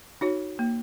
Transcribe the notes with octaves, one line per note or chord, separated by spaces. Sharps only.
D#4 F#4 C#5
A#3